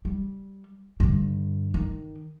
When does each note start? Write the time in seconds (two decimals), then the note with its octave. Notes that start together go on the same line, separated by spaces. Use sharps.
0.05 G3
1.00 G2 D3
1.74 D#3